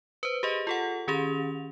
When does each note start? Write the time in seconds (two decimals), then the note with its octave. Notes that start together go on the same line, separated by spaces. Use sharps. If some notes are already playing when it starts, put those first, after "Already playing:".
0.23 B4 C5
0.43 G4 G#4 D#5
0.67 F4 A4 F#5
1.08 D#3 C#4 G4 G#4 F7